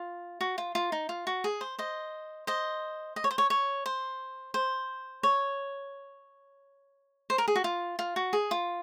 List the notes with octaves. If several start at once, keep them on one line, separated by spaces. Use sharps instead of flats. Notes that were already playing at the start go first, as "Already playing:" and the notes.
Already playing: F4
F#4
F4
F4
D#4
F4
F#4
G#4
C5
C5 D#5
C5 D#5
D#5
C#5
C5
C#5
C#5
C5
C5
C#5
C5
A#4
G#4
F#4
F4
F4
F#4
G#4
F4